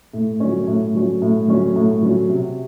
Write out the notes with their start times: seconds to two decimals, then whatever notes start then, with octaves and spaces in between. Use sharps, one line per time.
0.13 A2
0.40 F#3 C#4
0.67 A2
0.95 F#3 C#4
1.22 A2
1.48 F#3 C#4
1.76 A2
2.03 F#3 C#4
2.30 C3